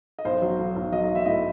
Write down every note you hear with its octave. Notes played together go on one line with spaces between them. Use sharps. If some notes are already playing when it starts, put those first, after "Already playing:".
D#5
B1 C5
F#3
B1
B1
F#3 D#5
D#5
B1
E5
A2 D#5